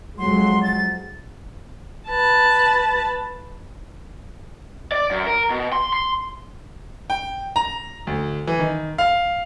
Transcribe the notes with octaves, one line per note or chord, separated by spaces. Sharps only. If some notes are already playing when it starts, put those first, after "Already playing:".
F2 F#3 G#3 C6
A6
B4 A5
D5
F#2
A#4
B2
C6
C6
G5
A#5
D2
E3
D#3
F5